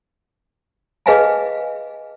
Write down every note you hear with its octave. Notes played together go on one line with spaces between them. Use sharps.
G#4 B4 D#5 F5 G#5 A5